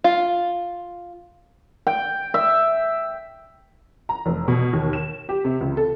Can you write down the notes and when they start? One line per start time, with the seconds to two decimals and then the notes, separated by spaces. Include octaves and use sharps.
0.04 F4
1.87 G5
2.34 E5
4.09 A#5
4.26 F1
4.48 B2
4.73 D#2
4.93 E7
5.29 G4
5.45 C3
5.61 C#2
5.77 A4